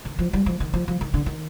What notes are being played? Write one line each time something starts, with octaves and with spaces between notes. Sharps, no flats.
D#3
F3
G3
F3
D#3
F3
F3
D#3
D3
D#3